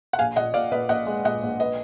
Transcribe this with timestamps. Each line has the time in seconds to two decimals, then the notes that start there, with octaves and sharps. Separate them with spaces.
0.13 F#5
0.19 A#1 F5 G#5
0.36 A#2 D#5 F#5
0.54 A#2 D5 F5
0.72 A#2 B4 D#5
0.89 A#1 D#5 F#5
1.07 G#3
1.25 A#2 D#5 F#5
1.43 A#1
1.60 B4 D#5